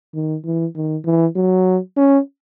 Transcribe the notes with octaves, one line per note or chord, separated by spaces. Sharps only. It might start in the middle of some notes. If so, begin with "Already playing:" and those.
D#3
E3
D#3
E3
F#3
C#4